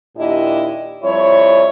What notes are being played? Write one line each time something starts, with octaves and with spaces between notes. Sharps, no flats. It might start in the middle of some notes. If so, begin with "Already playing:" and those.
D#2 A#2 D4 E4 G4 D#5
F2 G3 E4 C#5